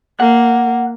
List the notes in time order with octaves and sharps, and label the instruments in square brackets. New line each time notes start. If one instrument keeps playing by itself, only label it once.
[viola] A#3 [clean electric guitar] F#5